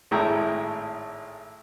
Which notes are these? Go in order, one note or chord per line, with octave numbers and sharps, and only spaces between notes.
G#1 A2 G#3 E4 G5 A#5